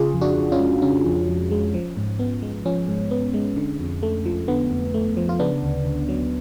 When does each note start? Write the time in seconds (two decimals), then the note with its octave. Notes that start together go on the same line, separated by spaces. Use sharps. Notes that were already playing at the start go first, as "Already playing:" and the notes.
Already playing: C#3 F4 G#4
0.14 F2
0.21 D4 F#4
0.37 F2
0.52 C#4 F4
0.59 G#3
0.82 C#3 C#4
1.05 F2
1.28 F2
1.51 G#3
1.74 F3
1.97 G#2
2.19 B3
2.42 G#3
2.65 F3 C#4
2.88 G#2
3.11 B3
3.34 G#3
3.57 D3
3.80 F2
4.03 A3
4.26 F3
4.48 D3 B3
4.71 F2
4.94 A3
5.17 F3
5.29 F4
5.39 C#3 B3 D4
5.63 D2
5.86 D2
6.08 F#3